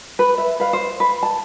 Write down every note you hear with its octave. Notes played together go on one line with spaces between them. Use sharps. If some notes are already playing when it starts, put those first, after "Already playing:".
B4
E5
B4 F5
C5
B4
A5